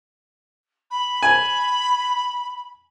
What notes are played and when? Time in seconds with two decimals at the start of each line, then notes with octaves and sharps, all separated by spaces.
0.90 B5
1.23 G#5